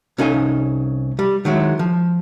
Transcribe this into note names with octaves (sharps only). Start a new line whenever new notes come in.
C2 C#4 D#4 A4 F5 G#5
G3
D#3 F#3 G#3 E4
F3